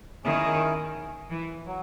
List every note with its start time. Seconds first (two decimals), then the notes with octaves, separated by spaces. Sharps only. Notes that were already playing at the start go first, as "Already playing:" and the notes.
0.24 D#3 C#4 E4 G#4
1.31 E3
1.66 F#3